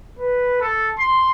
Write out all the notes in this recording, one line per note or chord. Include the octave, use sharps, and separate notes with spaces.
B4
A4
C6